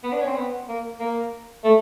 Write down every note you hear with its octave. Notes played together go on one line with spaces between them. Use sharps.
B3
D4
C#4
C4
B3
A#3
A#3
A3